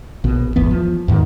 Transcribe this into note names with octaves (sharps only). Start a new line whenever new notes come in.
A#1 B2
D#1 G#1 E2 B3
F3
E2 G#2 D#3